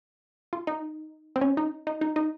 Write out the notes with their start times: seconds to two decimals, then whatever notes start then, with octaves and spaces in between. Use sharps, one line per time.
0.53 F4
0.67 D#4
1.36 C4
1.41 C#4
1.57 D#4
1.87 D#4
2.01 D#4
2.16 D#4